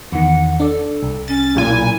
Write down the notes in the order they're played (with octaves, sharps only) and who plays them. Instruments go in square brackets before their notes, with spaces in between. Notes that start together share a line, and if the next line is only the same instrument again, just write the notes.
[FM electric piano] E2 D#3 [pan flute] F#5
[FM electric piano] D4 D5 [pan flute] A4
[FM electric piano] C2
[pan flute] C#4 [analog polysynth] A6
[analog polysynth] B1 A#2 G#5
[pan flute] E4